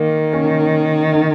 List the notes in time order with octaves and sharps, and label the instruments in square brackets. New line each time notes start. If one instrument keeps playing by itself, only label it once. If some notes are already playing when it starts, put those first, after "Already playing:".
Already playing: [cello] D#3 [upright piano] A#3
[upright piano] A#3 C#4
D#4